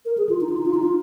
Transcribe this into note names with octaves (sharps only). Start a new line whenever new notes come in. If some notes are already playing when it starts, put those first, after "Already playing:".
A#4
G#4
F4
D#4
F4
D#4
F4
D#4
F4